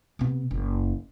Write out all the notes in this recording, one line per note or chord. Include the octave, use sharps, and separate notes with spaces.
C3 B3
F#1